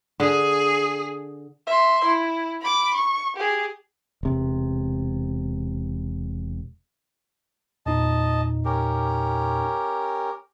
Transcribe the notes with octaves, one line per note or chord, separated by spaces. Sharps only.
D3 G#4
E5 C6
E4
B5 D6
C#6
G4 G#4
E1 C3
E2 A#2 D#4 D#5 A5
C#4 G4 A#4